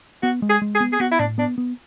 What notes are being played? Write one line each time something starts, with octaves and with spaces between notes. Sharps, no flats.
B3 F#4
G#3
G#4
G#3
G#4
B3
G#4
B3 F#4
E4
A2 D4
B3 D4
B3